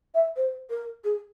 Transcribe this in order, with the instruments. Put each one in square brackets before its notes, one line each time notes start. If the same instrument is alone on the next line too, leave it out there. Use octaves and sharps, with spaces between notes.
[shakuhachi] E5
C5
A#4
G#4